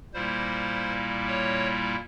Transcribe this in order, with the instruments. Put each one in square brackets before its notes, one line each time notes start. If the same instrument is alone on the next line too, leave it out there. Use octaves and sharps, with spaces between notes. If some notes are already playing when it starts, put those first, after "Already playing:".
[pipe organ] A#2 G3 A#3 E4 C5
C#5